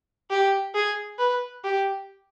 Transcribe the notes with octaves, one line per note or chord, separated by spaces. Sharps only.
G4
G#4
B4
G4